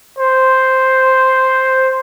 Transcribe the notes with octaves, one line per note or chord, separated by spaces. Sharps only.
C5